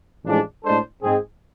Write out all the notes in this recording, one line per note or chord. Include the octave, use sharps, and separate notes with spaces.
A1 A2 F3 G#3 D4
A2 G#3 D4 A4 C5
G#2 G#3 C4 G#4